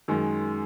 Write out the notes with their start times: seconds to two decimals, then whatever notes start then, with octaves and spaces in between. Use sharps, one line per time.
0.08 F#2 D#3 G#3